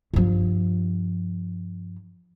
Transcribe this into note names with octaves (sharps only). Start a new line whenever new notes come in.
G2 F3